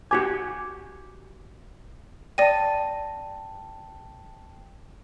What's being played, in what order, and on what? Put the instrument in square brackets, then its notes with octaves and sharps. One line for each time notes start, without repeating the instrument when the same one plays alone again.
[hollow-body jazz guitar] F#4 G4 G#5 [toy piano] D6
[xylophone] D5 A#6 D#7 [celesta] G5 A5